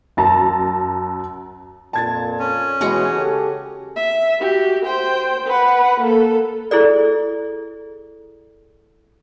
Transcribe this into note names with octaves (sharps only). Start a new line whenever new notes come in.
F#2 A5 A#5
F2 A#2 A5 G#6 A6
C#4
B2 E3 G#3 F#4 G#4 C#5 G#5
C#3 G4 A4
E5
F#4 G4
C5 G5
B4 F#5
A#3 A4
E4 G#4 A4 D5